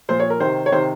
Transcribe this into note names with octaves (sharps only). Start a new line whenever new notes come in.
A#2 F3 C5
C#5
A#4
C3 D#3 C5
C#5
C3 D#3 C5